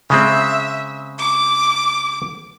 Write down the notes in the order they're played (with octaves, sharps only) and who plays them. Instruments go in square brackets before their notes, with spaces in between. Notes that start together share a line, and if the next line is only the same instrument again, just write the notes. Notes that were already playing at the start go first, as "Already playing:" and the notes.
[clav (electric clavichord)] C#3 G#3 C4 [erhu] E5
[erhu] D6